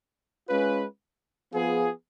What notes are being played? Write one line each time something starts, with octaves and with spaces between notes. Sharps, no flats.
G#3 C#4 F4 B4
F3 B3 F4 G#4